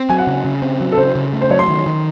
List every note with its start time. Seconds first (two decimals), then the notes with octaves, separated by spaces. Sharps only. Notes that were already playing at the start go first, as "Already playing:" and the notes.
Already playing: C4
0.09 F#3 G#5
0.18 F#5
0.27 C#3
0.45 C#3
0.62 C4
0.81 F#3
0.92 A4
0.98 C#3 C5
1.15 C#3
1.33 A3
1.41 C5
1.50 F#3 C#5
1.59 C6
1.68 D#3
1.86 D#3